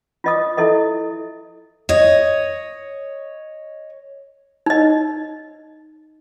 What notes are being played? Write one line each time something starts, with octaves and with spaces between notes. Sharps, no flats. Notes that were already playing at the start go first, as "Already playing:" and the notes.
F4 D#5 D#6
E4 A4 D#5 E5
C#5 D#5
D#4 D#5